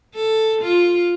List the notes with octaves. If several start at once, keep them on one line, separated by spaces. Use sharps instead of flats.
A4
F4